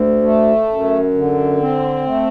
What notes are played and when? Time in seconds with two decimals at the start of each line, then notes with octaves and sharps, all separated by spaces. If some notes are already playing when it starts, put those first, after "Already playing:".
Already playing: D2
0.22 A3
0.68 F#2
1.14 D3
1.60 C4
2.06 A3